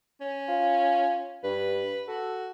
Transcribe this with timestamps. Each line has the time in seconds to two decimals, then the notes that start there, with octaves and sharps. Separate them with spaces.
0.21 C#4
0.48 F4
1.44 G2 B4
2.08 F#4 A4